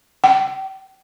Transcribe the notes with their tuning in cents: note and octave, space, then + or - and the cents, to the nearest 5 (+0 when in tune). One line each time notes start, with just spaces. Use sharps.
G5 -30